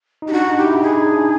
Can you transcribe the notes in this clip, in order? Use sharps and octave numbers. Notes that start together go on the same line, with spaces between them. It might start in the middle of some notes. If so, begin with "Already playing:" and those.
D#4
G4
D4 F#4
D#4
G4
E4
D#4 G#4
D4